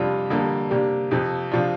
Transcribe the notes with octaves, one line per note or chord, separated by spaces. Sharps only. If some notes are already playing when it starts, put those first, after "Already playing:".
Already playing: F2 C3 G3 D4 F4
F2 D3 G3 A#3
C3 A#3 D4 G4
F2 C3 F3
C3 F3 D4 F4